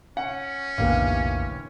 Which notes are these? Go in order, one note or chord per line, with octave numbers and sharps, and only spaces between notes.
C#4 F#5
F1 B1 A2 D3 E3 A#3 G4